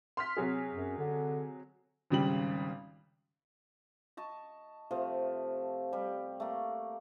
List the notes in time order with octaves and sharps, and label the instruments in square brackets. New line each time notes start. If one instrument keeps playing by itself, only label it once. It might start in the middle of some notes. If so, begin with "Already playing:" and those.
[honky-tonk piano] C6 F6 B6
C3 F#3 G#4
[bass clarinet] F#2
D3
[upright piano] G#1 C#3 G3 F#7
[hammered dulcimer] D#5 A5 C#6
C3 F3 A3
G3
A3 A#3